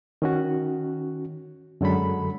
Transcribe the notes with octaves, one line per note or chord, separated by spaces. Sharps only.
D#3 C#4 F#4
F#2 D3 F#3 G#3 A4 B5